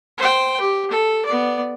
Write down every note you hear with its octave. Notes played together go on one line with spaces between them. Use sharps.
C5 G5
G4
A4
B3 D5